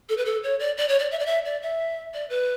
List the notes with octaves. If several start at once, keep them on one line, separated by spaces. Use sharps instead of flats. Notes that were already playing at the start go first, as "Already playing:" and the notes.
A4
B4
A4
C#5
D5
D5
C#5
D5
E5
D5
E5
D5
E5
D5
B4